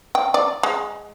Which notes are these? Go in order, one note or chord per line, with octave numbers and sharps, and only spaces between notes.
G5
D5
G#3